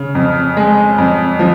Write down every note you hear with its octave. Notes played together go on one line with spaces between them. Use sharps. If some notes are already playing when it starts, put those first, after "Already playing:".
Already playing: C#3
F2
G#3
F2
F3